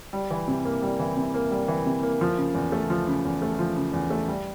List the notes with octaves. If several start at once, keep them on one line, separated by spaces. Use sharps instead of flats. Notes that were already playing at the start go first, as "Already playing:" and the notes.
G3
E3
C3
A#3
G3
E3
C3
A#3
G3
E3
C3
A#3
F3
C#3
E2
A3
F3
C#3
E2
A3
F3
C#3
E2
A3
G3